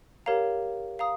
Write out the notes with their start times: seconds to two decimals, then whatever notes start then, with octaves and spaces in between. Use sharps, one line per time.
0.26 G4 A#4 C#5 F5 A#5
0.99 F5 A#5 D#6